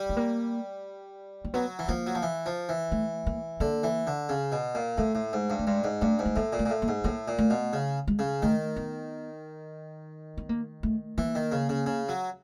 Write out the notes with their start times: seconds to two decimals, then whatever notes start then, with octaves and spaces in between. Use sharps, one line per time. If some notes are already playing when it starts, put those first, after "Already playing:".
Already playing: G3
0.09 A3
0.17 A#3
1.45 A#3
1.54 F#3 B3
1.79 E3
1.88 F3 A#3
2.07 F#3
2.15 F3
2.23 E3
2.46 F3
2.69 E3
2.92 A3
3.26 A#3
3.60 D3 A#3
3.83 E3
4.07 D3
4.29 C#3
4.52 B2
4.75 A#2
4.98 A2 A3
5.15 A2
5.33 G#2
5.50 G2
5.59 A3
5.67 G2 G#3
5.84 G#2
6.01 G2 A3
6.19 G#2
6.26 A3
6.36 A2 A#3
6.53 A#2
6.59 A3
6.66 A#2
6.70 A2
6.82 A#3
6.88 G#2
7.04 A2 A#3
7.28 A#2
7.38 A3
7.50 B2
7.73 C#3
8.07 G#3
8.19 C#3
8.42 D#3 A3
8.76 B3
10.37 B3
10.49 A#3
10.83 A3
11.18 E3 A#3
11.35 D#3
11.52 C#3
11.69 C#3
11.86 C#3
12.09 F#3